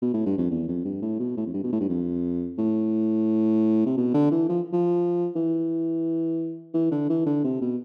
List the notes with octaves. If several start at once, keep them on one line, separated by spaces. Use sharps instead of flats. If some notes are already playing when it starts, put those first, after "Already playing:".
B2
A2
G2
F2
E2
F2
G2
A2
B2
A2
F2
G2
B2
A2
G2
F2
A2
C3
B2
D3
E3
F3
F3
E3
E3
D3
E3
D3
C3
B2